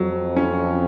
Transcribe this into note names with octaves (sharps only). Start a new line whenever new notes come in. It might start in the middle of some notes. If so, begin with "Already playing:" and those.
Already playing: F2 F#3
C#4